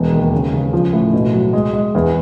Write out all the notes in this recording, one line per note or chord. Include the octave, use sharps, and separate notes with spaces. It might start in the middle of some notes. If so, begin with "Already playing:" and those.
Already playing: E1 E2
D#2
C#3
C#3
F3
A2
B2
F#3
G#3
G#3
E2